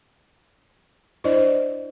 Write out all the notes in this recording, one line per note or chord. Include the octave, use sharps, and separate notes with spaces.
D4 E4 C5 D5 D#5